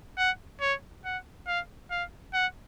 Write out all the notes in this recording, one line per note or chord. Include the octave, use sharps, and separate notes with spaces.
F#5
C#5
F#5
F5
F5
F#5